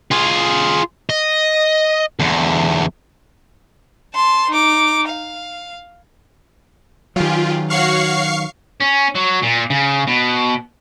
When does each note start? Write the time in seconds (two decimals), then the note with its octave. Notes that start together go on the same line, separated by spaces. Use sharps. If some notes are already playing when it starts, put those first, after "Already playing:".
0.12 F4 G#4
1.10 D#5
2.20 E2 D3
4.14 A5 C6
4.50 D#4 D6
5.09 F5
7.16 D#3 F#3 F4 G4 G#4
7.70 F#4 C#5 F5 F#5 C#6 C7
8.80 C#4
9.15 F#3
9.43 A#2
9.70 C#3
10.07 B2